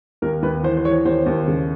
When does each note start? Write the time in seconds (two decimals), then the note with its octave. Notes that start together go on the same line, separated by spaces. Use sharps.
0.22 D#2 A#4
0.42 D#2 B4
0.63 E3 C5
0.77 C5
0.85 E3 C#5
1.05 D#2 C5
1.26 D#2
1.48 C#3